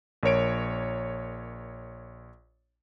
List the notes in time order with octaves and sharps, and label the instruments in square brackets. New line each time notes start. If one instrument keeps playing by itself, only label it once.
[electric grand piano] A#1 A#4 C#5 D7